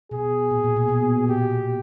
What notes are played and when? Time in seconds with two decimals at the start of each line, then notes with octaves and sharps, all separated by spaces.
0.11 B2 G#4
0.51 A#2
0.64 A#2
0.77 B2
0.89 B2
1.28 A#2 G4